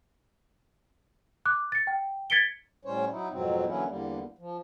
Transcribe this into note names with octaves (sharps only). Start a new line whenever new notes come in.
D6 F#6
A6 C#7
G5
G#6 A6 B6 C#7 D7 G7
A2 G3 C#4 C5 C#5
F#3 D#4 E4
F2 G#2 B2 F#3 C4
D3 E3 F#3 A#3 C#4 E4
E2 D3 G3 A#3
F3